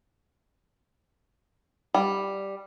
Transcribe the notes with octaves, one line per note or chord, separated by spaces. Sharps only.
G3